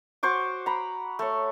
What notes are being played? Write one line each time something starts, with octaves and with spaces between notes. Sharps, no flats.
F#4 C5 C#6 D6
A#5 B5
A3 C#5